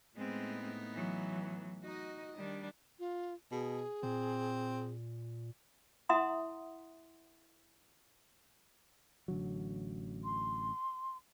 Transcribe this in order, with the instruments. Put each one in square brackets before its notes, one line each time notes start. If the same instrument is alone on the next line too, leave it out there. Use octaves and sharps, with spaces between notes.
[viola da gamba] A2 B3 D#4 [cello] G#3 C4
[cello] E3 F#3
[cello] D#4 [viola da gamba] F#4 D#5
[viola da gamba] D#3 D4 [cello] G3
[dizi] F4
[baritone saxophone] B2 [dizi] G#4
[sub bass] A#2 [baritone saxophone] C4
[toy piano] E4 E5 F#5 A#5 C6 D#6
[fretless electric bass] A1 D3 F#3
[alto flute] C6